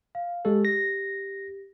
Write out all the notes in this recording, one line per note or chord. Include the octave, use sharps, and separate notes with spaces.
F5
G#3 G4 A4
A#6